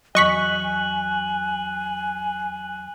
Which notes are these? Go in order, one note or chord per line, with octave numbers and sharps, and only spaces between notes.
E2 F#3 D#5 G#5 C#6 F#6 B6 F#7